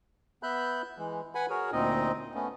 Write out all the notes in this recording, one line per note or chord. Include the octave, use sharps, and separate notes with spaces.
B3 E5 B5 F#6 G6
E3 G#3
B4 F#5 G#5 B5
F#4 G#4 A#4 C#5
D2 A#2 C4 D#4 D#5
A3 B3 C#4